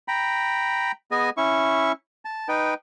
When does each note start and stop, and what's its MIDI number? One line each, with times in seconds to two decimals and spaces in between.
0.08 0.92 79
0.08 0.92 82
0.08 0.92 83
1.11 1.30 59
1.11 1.30 68
1.11 1.30 75
1.11 1.30 80
1.37 1.92 61
1.37 1.92 64
1.37 1.92 76
1.37 1.92 85
2.25 2.48 81
2.49 2.74 63
2.49 2.74 71
2.49 2.74 79